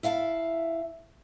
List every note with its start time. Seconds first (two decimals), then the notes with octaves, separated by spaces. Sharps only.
0.03 E4 E5 F5 G#5 A5